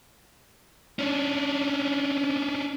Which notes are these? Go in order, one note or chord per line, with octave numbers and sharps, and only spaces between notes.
C#4 D4